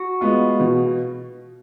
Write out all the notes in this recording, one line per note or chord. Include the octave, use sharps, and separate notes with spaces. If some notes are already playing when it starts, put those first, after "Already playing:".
Already playing: F#4
G#3 B3 F4
B2